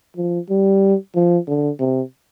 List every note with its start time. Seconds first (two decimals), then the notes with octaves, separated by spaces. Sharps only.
0.17 F3
0.49 G3
1.15 F3
1.47 D3
1.79 C3